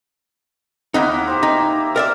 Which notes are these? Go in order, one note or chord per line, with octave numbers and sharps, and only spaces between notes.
D#2 A#3 B3 D#4 E4 F#5
G4 C5
D#4
A#4 D5 E5